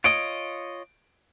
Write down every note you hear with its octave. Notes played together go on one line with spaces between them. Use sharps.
F4 C#5 D#5 D7